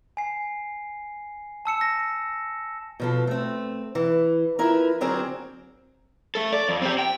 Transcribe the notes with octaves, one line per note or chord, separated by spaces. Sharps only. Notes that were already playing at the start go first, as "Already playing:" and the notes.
G#5 C7
A5 E6 C#7 E7
A#6
B2 F3 A4
A3 C4
E3
F3 E4 A#4 B4
D3 F#3 C4 G#4 A#4
A3 A4
D5
F2
C4 G4
G5